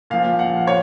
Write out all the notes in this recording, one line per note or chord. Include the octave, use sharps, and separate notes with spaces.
A#2 F3 F5
F#5
C#5